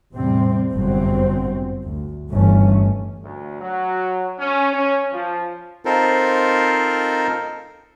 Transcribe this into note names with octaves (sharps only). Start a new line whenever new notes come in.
E2 A2 C3 G3 C4
G1 F#2 C3 F#3 C4
D2
G1 G2 E3 A3 C#4
D2
F#3
C#4
C#4
F3
C4 D#4 F4 A4 A#4 C5